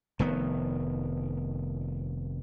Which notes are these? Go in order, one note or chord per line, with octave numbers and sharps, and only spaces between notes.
F1 D#3 B3